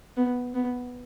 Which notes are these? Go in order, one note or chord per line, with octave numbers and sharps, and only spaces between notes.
B3
B3